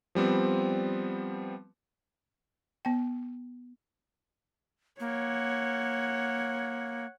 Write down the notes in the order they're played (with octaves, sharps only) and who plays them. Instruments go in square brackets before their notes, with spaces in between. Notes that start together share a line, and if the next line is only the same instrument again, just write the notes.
[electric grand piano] F3 G3 B3 C4
[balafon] B3 G5
[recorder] A#3 [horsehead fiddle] C#5 F#5